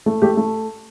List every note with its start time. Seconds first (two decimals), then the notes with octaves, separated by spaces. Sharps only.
0.06 A3
0.22 A3 G4
0.37 A3